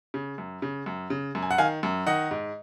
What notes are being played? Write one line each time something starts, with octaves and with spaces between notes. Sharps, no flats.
C#3
F#2
C#3
F#2
C#3
F#2
G#5
F#5
D#3 F5 G#5
F#2
D#3 D#5 F#5
G#2